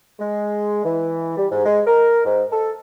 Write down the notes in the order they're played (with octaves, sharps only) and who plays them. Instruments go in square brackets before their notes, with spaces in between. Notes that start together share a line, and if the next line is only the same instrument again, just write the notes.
[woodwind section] G#3
E3
G3
G#2
G#3
A#4
G#2
A4